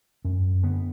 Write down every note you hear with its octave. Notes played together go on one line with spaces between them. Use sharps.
F#2 C#4
D3 B3